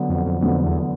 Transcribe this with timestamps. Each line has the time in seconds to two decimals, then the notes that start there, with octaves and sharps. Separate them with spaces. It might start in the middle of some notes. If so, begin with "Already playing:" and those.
Already playing: D3 F#3 B3
0.09 F2
0.26 F2
0.41 F2 D3 F#3 B3
0.64 E2